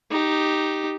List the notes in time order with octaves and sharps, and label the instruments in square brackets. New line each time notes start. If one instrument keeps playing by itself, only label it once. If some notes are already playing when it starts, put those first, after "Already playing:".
[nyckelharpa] D#4 G4